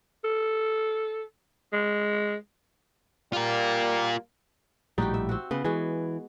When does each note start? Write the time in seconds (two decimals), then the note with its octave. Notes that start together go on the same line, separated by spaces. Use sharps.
0.25 A4
1.73 G#3
3.33 G3 A#3 F4 A#4
4.98 A#1 A2 G3 D#4 F#4 G4
5.14 E5
5.29 C4 F#4
5.51 C#3 B3
5.65 E3 G#3 F#4